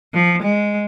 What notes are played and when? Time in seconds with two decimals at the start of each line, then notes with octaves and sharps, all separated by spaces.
0.14 F3
0.42 G#3